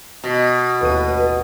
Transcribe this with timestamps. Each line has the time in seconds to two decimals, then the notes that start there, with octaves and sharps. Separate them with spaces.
0.24 B2
0.81 A1 D#2 B4 D#7